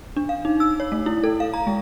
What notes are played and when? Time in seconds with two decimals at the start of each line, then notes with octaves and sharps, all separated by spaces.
0.16 D4
0.29 F5
0.45 D#4
0.60 E6
0.80 C#5
0.92 A3
1.06 E4
1.24 A4
1.40 F5
1.54 A#5
1.67 G#3